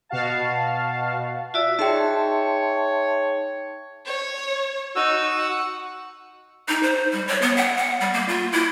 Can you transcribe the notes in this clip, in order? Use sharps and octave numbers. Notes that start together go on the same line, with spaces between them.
B2 F#4 F5 A5
F4 F#4 D5 E5
D#4 G#4 C#5 E5 G5 A5 C6
C#5
D#4 F#4 E6
F#5
D#4
C5
G3
C#5
B3
F#5
F#5
G3
A#3
F4
E4